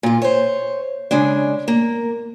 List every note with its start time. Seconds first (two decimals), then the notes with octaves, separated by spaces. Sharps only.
0.03 A#2 F4
0.22 C5 C#5
1.11 C#3 G#3 C#4 D4
1.68 A#3